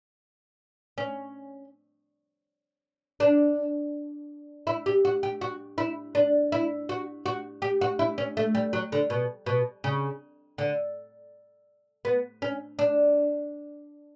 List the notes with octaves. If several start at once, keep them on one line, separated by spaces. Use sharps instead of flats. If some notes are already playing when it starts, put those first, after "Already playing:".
C#4
D4
E4
G4
F#4
G4
F#4
E4
D4
E4
F#4
F#4
G4
F#4
E4
C#4
A3
G3
F#3
D3
B2
B2
C#3
D3
B3
C#4
D4